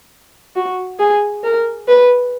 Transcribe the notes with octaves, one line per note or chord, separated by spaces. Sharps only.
F#4
G#4
A#4
B4